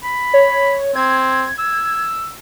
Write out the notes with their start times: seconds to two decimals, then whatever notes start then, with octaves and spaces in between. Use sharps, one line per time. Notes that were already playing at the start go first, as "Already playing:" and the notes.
0.03 B5
0.34 C#5
0.95 C4 G#6
1.59 E6